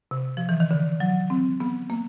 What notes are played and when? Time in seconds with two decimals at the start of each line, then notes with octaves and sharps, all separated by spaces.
0.11 C3
0.37 F3
0.49 E3
0.60 D#3
0.71 D3
1.00 F#3
1.30 C4
1.60 B3
1.90 A#3